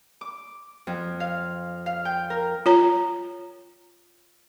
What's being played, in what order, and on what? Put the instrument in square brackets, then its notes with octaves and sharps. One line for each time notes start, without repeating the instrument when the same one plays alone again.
[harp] D6
F2
F5
F5
G5
A#4
[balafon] F4 C#5 A#5